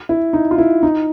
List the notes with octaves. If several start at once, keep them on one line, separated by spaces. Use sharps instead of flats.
E4
D#4
F4
E4
D#4